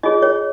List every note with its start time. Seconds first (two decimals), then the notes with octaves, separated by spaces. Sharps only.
0.03 F4 G#4 C#5 D#5
0.22 C#5